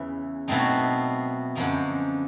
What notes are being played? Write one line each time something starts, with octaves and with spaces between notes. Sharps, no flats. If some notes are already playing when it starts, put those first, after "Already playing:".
Already playing: E2 C#3 E3
B2 F#3 A3 C4 D#4
F#2 D3 F3 A#3 D#4